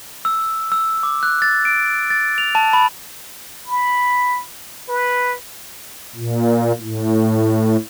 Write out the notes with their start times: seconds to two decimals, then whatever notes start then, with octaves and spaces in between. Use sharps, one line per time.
0.25 E6
0.72 E6
1.03 D6
1.23 F#6
1.42 A6
1.65 D7
2.10 A6
2.38 F7
2.55 A5
2.73 B5
3.67 B5
4.89 B4
6.16 A#2
6.81 A2